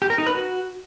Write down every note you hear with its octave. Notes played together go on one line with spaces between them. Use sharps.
G4
A#4
D#4
B4
F#4